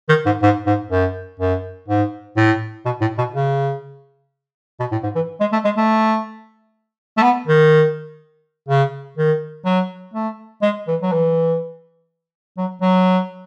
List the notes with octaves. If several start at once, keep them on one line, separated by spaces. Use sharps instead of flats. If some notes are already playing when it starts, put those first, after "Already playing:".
D#3
G#2
G#2
G#2
F#2
F#2
G#2
A2
B2
A2
B2
C#3
B2
A2
G#2
E3
G#3
A3
G#3
A3
A3
B3
D#3
C#3
D#3
F#3
A3
G#3
E3
F#3
E3
F#3
F#3